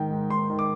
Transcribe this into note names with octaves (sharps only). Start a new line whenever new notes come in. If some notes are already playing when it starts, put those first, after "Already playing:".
Already playing: G#2 D#3 G5
G#2
G#2 C6
D#3
D6